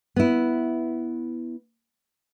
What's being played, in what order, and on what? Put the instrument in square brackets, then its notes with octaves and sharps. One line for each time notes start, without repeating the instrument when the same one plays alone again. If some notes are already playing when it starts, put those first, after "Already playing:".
[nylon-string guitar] B3 E4